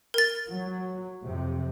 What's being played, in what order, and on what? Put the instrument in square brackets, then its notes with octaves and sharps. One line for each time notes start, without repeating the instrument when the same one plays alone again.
[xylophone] A#4 A6
[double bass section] F#3
F2 C3